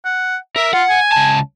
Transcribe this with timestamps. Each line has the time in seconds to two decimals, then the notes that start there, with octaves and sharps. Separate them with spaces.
0.05 F#5
0.56 A#4 E5
0.73 F4 F#5
0.89 G#5
1.12 C#2 A5